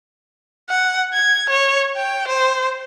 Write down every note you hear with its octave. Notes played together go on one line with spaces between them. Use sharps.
F#5
G#6
C#5
G5
C5